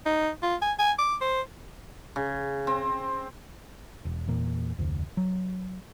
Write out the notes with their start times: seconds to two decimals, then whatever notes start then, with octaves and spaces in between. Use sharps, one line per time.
0.06 D#4
0.43 F4
0.62 G#5
0.79 G#5
0.99 D6
1.21 C5
2.16 C#3
2.67 C4
4.05 E1
4.28 E2 A#2
4.79 F1 D2
5.17 F#3